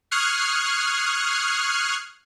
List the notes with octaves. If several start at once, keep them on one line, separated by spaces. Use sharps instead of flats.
C#6 D#6 F6 F#6 G#6 C7